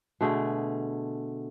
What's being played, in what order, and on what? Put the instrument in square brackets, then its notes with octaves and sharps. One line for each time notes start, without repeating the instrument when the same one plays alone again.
[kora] B2 D3 A3 G#4